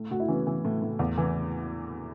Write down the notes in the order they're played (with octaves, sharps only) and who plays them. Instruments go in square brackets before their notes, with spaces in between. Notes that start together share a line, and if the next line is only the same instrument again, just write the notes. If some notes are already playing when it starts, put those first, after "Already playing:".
Already playing: [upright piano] A2
A2 F#4
E4
E3 C#4
B3
E3
A2
A2
E2
E3